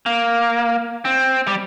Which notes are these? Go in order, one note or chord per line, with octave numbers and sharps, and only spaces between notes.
A#3
C4
G3